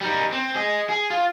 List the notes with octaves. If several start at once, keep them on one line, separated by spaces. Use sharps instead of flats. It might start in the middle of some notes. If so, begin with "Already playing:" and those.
G3 D#4
C4
G#4 D#5
G#4
F4